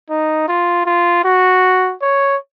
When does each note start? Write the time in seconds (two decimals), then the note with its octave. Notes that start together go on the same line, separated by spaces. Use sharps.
0.10 D#4
0.49 F4
0.86 F4
1.25 F#4
2.02 C#5